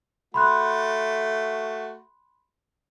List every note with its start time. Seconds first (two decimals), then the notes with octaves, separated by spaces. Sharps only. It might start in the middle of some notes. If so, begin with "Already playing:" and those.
0.34 A3 F#4 B5 C6 F#6